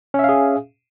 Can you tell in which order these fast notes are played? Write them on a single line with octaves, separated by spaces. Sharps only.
C#4 E5 F5 G#4